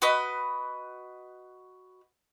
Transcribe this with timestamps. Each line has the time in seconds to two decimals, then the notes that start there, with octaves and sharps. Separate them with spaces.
0.02 F#4 B4 D#5